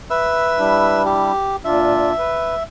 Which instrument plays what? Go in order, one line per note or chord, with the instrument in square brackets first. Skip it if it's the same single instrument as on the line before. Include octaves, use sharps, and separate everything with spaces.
[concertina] B4 E5 E6
[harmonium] G3 D4 E4
[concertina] G4
[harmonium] A#2 D4 F4 [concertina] E5
[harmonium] B4